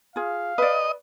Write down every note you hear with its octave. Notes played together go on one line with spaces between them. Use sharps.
F4 G#4 F5
B4 D5 D#5